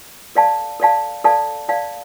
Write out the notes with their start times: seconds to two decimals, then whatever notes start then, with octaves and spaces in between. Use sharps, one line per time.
0.35 A4 D5 F5 A5
0.80 A4 D5 F5 A5
1.24 A4 D5 F5 A5
1.68 A4 D5 F5 A5